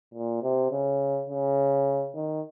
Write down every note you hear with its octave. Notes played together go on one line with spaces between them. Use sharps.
A#2
C3
C#3
C#3
D#3